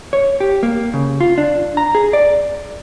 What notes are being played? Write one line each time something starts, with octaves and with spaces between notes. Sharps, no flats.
C#5
G4
A#3
C#3
F4
D4
A#5
G#4
D5